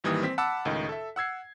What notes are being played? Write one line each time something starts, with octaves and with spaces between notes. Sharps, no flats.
G#1 D#3 E3 G3 A#3 D#6
C4 B6
F#5 A5 B5 D6 E6
C#2 A2 D#3 D#5
A4 E5
F#5 E6 G#6 C7